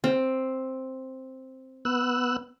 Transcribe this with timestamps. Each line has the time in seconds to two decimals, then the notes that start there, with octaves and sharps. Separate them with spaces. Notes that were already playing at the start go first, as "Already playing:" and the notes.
0.04 C4
1.85 B3 E6 F#6